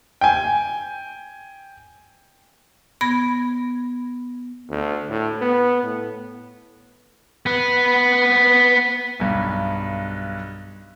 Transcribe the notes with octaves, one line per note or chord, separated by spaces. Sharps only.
G5 G#5
B3 B5 G#6 A#6
D2
A2
B3
A2
B3 B4
B1 G2